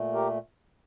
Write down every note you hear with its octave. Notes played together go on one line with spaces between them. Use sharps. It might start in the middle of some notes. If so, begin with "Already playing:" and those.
Already playing: A#2 A3
G4 A#4